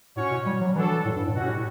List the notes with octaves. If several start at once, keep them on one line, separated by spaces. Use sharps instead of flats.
A2 C#4 F#4 C#5
B2
G3
F#3
E3 D4 F#4 A4
A2
G2
A2
B2 G3 C#4 F#4
A2